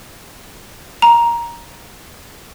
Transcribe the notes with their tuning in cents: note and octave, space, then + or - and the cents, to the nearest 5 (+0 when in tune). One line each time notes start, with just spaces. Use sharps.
A#5 +10